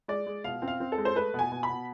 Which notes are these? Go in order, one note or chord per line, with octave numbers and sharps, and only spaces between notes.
G#3 D5
G#3
B2 F5
C4
F5
C4
A4
G#3
C5
A3 B4
B2 G#5
B2
B5
B2